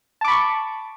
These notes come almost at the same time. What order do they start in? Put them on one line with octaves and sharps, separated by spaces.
A5 D6 B5 C#6